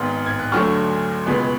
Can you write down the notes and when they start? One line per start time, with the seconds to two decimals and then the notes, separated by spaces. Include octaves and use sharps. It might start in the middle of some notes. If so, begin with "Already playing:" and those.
Already playing: G#1 G#2 G#3 B3 F6
0.26 G#6
0.39 F#6
0.52 D2 D3 F#3 A3 C#6 F6
1.26 C#2 B2 G#3 B3